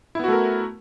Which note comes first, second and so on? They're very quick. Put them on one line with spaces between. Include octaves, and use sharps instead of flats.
E4 B3 F#4 A3 A#4